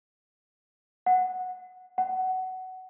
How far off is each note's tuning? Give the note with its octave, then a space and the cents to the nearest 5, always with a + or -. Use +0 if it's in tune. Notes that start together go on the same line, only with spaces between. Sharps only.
F#5 -10
F#5 +15